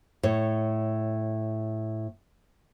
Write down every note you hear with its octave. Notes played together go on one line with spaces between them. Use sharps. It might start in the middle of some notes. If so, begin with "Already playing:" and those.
A2 C#5